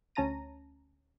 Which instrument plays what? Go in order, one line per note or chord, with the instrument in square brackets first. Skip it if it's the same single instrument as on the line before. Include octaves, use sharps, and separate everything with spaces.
[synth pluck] D2 C#4 A5 A#5 A#6 D#7